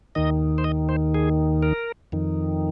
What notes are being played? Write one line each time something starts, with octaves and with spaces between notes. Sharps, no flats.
D#2 D#3 D#5
C5
D#5
C5
G#4
A#4
F2 D#3